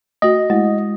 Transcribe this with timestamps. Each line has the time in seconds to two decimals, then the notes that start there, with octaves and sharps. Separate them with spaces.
0.22 A3 F#4 D#5
0.50 G#3 A3 E4